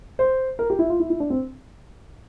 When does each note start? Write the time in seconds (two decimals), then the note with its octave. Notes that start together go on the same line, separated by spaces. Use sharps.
0.19 C5
0.59 A#4
0.70 G4
0.79 E4
0.90 F4
1.00 E4
1.10 E4
1.20 D4
1.30 C4